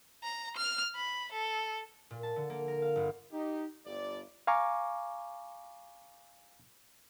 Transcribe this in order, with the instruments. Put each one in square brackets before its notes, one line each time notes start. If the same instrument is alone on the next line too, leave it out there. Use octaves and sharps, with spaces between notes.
[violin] A#5
F6
B5
A4
[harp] A#2
A5
D3
A#3
A#4
F5
G1
[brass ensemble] D#4 G4
G1 G2 D5
[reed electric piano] F5 G#5 A#5 C#6 D6